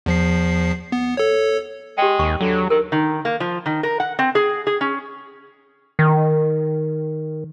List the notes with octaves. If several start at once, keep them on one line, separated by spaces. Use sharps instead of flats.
E2 F3 C7
B3
A4 C#5
G#3 G4 G5
D#2 C#6
D3 F#3
D#3 A#4
D#3
A#3
F3
D#3
A#4
F#5
C4
G#4
G#4
C#4
D#3